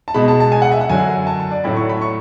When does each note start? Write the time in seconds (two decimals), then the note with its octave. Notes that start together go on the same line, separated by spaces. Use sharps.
0.08 A5
0.14 B2 G#3 B5
0.28 A5
0.40 A5
0.52 G#5
0.62 F#5
0.72 E5
0.81 F#5
0.90 F#2 D3 F#3 G#5
1.27 A5
1.40 A5
1.51 D5
1.64 A2 F#3 A3 B5
1.76 C#6
1.89 B5
2.01 C#6